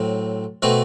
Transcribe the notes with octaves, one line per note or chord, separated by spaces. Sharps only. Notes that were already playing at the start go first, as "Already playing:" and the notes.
Already playing: A2 F#3 C4
B2 A3 C4 F#4 B4